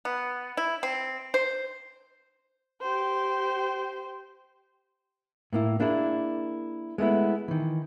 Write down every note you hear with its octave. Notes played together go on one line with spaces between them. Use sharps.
B3
E4
C4
C5
G4 C5
A2 A#3 E4
A#3 D4 E4 G#4
G#3 A3 B3 E4
D#3 E3